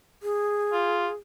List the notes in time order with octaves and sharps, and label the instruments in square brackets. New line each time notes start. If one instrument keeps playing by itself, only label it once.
[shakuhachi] G#4
[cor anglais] F4